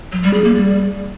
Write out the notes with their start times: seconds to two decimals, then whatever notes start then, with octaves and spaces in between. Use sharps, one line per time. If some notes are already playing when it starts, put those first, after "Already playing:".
0.12 F#3
0.23 G3
0.33 G#4
0.44 A#3
0.55 G3